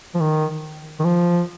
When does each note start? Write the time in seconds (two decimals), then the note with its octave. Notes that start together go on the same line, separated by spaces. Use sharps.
0.14 F3
0.20 D#3
0.99 D#3
1.04 F3